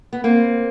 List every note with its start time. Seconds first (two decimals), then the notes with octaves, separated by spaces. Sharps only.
0.13 B3
0.24 A#3 C4